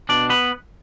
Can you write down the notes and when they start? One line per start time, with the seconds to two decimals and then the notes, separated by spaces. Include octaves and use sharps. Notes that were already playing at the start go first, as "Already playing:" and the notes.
0.09 B2 D4 D5
0.30 B3 B4